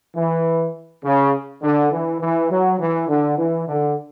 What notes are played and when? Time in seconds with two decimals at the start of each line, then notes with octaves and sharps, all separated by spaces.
0.15 E3
1.04 C#3
1.62 D3
1.92 E3
2.20 E3
2.50 F#3
2.80 E3
3.08 D3
3.37 E3
3.68 D3